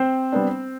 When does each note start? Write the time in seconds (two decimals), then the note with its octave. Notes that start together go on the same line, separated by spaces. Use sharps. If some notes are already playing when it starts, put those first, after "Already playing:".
Already playing: C4 C5
0.32 G3 B3 D4